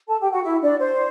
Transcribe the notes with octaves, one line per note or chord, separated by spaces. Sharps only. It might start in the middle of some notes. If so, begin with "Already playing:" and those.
A4 A5
G4 G5
F#4 F#5
E4 E5
D4 D5
C5